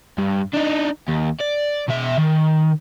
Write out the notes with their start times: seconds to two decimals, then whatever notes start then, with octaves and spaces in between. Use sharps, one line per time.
0.18 G2
0.53 D4 D#4
1.08 D#2
1.40 D5
1.88 B2 E5
2.18 D#3